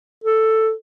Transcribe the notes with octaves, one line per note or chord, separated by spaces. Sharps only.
A4